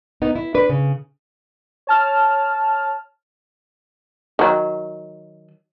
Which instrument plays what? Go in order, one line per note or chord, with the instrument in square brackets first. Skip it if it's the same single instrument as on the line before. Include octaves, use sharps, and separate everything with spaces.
[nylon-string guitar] B3 D#4
E4
D4 B4
C#3
[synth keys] C#5 A5 F6
[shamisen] D#3 F#3